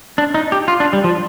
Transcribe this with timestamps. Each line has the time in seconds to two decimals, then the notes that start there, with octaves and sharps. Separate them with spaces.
0.18 D4
0.34 D#4
0.52 G4
0.68 F4
0.80 D4
0.93 G3
1.04 F3